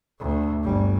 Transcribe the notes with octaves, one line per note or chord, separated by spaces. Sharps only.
D2
G1 G3